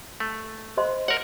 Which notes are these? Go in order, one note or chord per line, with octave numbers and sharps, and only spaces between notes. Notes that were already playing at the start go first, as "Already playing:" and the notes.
A3
C5 D#5 C6
A#4 C#5 F#5